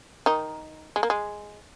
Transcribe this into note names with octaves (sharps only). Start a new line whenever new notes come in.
D#3 D#4
G#3
A#3
G#3